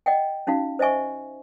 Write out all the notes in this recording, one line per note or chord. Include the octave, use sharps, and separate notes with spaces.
D#5 F#5 G5
C#4 D#4 F#4 F5
C5 D#5 E5 G#5 C#6